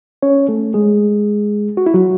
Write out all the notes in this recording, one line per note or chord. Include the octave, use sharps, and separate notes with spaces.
C#4 C#5
A3 A4
G#3 G#4
F#4
E4
F#3 F#4